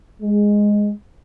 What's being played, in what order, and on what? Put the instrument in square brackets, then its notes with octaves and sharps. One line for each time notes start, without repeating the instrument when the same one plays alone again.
[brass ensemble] G#3